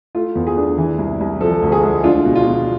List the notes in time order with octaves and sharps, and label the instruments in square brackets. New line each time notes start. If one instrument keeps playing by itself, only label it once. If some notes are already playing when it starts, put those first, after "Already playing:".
[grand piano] A3 F4
E2
G#4
D4
E3
C2
C2
F3 A4
D2
G#4
G#3
D4 F4
B2
F4
B2